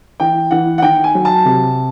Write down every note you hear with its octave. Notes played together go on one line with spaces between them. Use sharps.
E3 G5
E3 F#5
F#5
D#3 G5
G#5
F#3
A5
C3